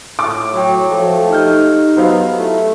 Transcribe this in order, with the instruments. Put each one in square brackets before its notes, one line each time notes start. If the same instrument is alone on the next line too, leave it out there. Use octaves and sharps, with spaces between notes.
[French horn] A2 [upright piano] D6
[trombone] F#3 [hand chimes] F#4 G5
[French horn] F3 [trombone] A3
[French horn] D#4 [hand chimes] G4 F6 G6
[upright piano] F#3 C5 F5 [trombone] B3
[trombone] A3 [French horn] E4